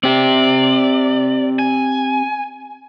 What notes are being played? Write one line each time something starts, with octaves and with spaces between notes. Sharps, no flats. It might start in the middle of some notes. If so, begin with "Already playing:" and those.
C4 G4 D5
G#5